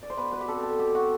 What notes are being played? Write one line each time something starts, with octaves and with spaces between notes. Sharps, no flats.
D5
C5
B2 B4
B4
G4
C4 A4
A4
B2 G4
F#4